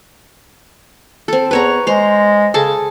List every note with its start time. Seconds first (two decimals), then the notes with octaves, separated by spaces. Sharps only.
1.28 C4 A4
1.51 E2 B4 C#5 A#5
1.87 G#3 C5 A#5
2.54 C#3 G#4 A4 A5